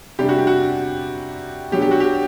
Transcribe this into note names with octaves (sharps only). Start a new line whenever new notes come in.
C3 G3 D4 G4
F#4
G4
F#4
B2 F#3 B3 D4 G4
G4
F#4
G4